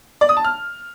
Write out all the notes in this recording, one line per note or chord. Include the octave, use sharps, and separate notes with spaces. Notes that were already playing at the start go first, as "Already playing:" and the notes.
D5
D#6
A5
F6